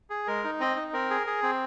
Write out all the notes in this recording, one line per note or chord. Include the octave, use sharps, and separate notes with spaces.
G#4
G#3 A#4
D#4
C4 D#5
D#4
C4 A#4
G#4
G#4
C4